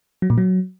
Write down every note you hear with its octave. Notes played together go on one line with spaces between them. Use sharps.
F#3
A#2
F#3